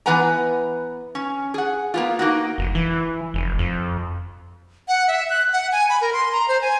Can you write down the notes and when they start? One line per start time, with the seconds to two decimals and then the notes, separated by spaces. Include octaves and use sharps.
0.06 E3 B3 B4 F#5 G#5 A#5
1.15 C#4
1.54 G#4 F#5
1.94 A#3 B3 F4
2.19 A#3 D#4 F#4
2.58 F1
2.75 E3
3.34 F1
3.59 F2
4.88 F#5
5.08 E5
5.30 F#6
5.53 F#5
5.72 G#5
5.89 B5
6.01 A#4
6.13 C6
6.33 A#5
6.48 C5
6.62 G#5